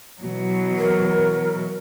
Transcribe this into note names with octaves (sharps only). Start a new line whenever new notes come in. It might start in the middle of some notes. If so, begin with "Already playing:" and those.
B2 E3 F#3
A#4